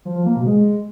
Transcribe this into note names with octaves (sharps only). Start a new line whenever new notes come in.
F3
F3
A#3
B2
G#3